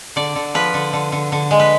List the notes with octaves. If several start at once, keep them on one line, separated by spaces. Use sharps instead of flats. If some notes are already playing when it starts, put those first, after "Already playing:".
D3 D5
D3
F3 B4
D3
D3
D3
D3
G#3
B4